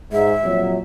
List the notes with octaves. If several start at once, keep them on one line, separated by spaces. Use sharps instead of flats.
G#2 E5
F2 A#2 F#3